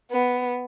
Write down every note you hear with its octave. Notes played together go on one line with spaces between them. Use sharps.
B3